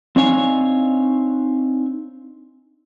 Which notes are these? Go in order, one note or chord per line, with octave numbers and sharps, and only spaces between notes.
C4 D4 D#4 C#5 F5 G#5